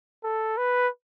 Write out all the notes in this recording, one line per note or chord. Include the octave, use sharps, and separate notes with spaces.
A4
B4